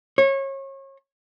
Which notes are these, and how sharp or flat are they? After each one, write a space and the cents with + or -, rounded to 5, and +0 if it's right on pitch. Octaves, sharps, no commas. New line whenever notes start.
C#5 -30